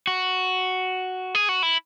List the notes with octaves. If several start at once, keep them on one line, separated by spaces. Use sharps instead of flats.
F#4
G#4
F#4
E4